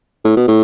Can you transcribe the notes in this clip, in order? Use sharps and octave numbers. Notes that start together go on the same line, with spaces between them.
A2
B2
A2